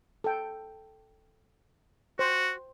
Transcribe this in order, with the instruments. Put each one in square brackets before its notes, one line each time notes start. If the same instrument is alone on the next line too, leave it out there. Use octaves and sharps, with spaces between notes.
[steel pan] A4 G5
[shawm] F#4 [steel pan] C5